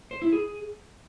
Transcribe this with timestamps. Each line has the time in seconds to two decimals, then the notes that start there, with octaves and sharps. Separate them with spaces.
0.11 C5
0.22 E4
0.32 G#4